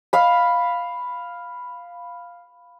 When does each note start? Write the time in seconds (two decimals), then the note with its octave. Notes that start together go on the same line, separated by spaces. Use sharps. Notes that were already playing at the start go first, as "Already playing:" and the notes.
0.13 F5 B5